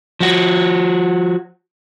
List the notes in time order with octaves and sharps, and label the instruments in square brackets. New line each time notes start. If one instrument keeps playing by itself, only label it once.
[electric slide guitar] F3 F#4